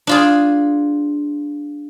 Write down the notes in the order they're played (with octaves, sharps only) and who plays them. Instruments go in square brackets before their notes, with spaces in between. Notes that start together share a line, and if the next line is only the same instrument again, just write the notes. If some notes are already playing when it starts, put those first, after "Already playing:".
[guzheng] D4 F4 G#4